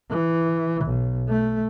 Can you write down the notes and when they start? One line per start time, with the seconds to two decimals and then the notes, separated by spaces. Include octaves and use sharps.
0.10 E3
0.85 B1
1.29 A3